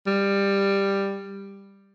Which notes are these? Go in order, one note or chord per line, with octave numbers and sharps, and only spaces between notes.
G3